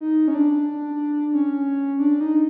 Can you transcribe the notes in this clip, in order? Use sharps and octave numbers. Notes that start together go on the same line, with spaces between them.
D#4
C#4
D4
C#4
D4
D#4